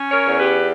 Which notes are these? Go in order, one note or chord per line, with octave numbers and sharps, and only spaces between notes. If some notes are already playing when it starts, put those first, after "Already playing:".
Already playing: C#4
A#4 C#5
E2
G4 B4